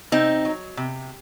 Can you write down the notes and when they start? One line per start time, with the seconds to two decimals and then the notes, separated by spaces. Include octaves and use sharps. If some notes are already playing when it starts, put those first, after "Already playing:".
0.12 C3 C4 D#4
0.45 F#3
0.77 C3